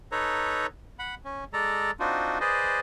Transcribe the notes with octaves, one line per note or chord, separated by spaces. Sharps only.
D#4 A4 B4 C#5 A#5
F#5 B5
C#4
G#3 A4 D5 A#5
C4 D4 D#4 F4 F#4
G#4 B4 C5 D5 D#5